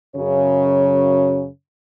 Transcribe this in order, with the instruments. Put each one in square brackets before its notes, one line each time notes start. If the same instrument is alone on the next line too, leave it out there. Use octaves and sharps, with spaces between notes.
[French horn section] F#2 C#3 C#5